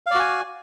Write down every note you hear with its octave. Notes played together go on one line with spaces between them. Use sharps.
F#4 D5 F5 G#5